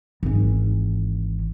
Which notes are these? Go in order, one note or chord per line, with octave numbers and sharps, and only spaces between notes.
G#1 E3